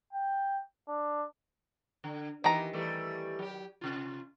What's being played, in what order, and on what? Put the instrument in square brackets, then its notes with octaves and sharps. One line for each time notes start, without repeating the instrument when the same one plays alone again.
[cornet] G5
D4
[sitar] D3
[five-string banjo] D#3 A#5 [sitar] E3 B3 G4
[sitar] E3 G3 A3
F#3 G4
C3 F4